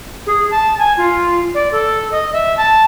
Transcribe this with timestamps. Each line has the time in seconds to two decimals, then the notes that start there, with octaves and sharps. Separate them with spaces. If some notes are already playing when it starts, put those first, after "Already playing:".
0.26 G#4
0.51 A5
0.78 G#5
0.97 F4
1.54 D5
1.72 A4
2.11 D#5
2.33 E5
2.57 A5